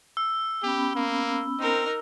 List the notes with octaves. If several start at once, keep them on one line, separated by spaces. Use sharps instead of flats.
E6
B3 C#4 G4 B5
A#3
C4 D#4 A#4